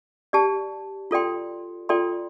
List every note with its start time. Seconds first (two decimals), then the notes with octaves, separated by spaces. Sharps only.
0.33 G4 D5 A5
1.11 F4 A4 D5 G5 C6
1.89 F4 A4 D5 G5 C6